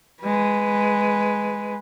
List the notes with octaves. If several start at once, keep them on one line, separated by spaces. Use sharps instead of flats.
G#3 B4